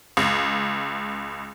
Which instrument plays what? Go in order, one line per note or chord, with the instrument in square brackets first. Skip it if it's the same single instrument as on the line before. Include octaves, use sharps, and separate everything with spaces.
[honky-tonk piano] C#2